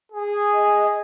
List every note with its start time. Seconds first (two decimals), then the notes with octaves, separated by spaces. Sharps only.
0.12 G#4
0.54 D#5